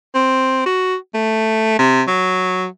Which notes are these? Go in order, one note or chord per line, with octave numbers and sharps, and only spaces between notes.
C4
F#4
A3
C3
F#3